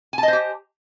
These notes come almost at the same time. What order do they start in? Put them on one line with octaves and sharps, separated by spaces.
G#5 A5 D#5 C5 G4